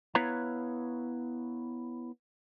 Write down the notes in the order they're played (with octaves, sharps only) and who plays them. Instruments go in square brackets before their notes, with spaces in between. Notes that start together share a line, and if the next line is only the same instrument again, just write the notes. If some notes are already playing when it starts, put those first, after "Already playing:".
[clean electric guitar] B3 E4 B4 C#5 F5 A#5